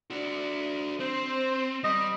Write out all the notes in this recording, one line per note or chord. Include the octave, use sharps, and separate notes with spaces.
D4 F#4
C4 C5
G3 D#5